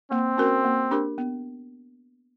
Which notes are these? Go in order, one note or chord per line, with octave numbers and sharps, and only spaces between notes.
A#3 C4
C#4 F#4 A#4
A#3
D4 G4 A#4
B3